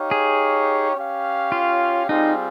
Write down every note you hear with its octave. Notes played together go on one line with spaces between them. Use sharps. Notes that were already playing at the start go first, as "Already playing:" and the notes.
Already playing: D#4 G4 C#5 F5
G#4
C#4 G4 C#5 F5
F4
G3 C4 D#4 F4 G#4